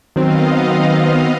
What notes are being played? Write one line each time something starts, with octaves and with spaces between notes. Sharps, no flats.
D#3 F#3 B3 C4 D#5 F5